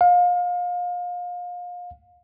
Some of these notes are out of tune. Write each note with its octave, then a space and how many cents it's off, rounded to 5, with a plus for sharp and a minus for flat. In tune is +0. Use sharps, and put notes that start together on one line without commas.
F5 +30